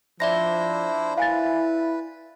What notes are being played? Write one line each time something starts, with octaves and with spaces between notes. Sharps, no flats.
F3 D4 E4 C5 D5 E5 A#6
E4 B4 F5 G#5 A6